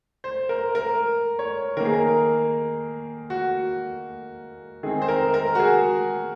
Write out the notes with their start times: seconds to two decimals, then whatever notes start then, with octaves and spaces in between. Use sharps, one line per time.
0.24 C5
0.49 A#4
0.75 A#4
1.39 C#5
1.77 D#3 A#4
1.80 A#3
1.85 G#4
1.94 A#4
3.30 F#4
4.83 D#3 G#3 C4 G#4
5.02 C5
5.08 A#4
5.34 A#4
5.55 F#4
5.60 G#4